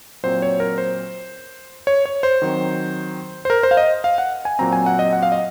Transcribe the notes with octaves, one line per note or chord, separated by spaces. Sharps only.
A#2 F#3 C4 C5
C#5
A#4
C5
C#5
C#5
C5
D#3 F#3 C4
C5
A#4
C5
F5
D#5
F5
F#5
G#5
A#2 F#3 C4 A#5
G#5
F#5
D#5
F#5
F5
D#5